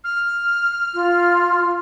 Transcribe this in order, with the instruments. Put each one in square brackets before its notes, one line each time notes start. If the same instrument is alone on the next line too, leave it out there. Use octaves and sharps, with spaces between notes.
[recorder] F6
[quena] F4